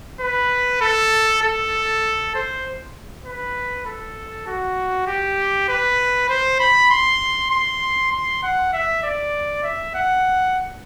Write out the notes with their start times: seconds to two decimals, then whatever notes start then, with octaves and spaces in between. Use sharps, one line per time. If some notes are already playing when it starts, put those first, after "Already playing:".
0.21 B4
0.81 A4
1.42 A4
2.34 C5
3.26 B4
3.86 A4
4.47 F#4
5.07 G4
5.68 B4
6.29 C5
6.59 B5
6.91 C6
7.51 C6
8.12 C6
8.43 F#5
8.73 E5
9.03 D5
9.63 E5
9.95 F#5